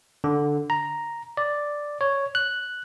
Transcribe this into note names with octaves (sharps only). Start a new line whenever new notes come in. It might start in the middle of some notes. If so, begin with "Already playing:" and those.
D3
A#5
D5
C#5
F#6